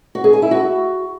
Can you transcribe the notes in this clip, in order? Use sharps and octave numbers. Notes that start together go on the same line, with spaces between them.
F#4
G#4
G#5
E4
F#4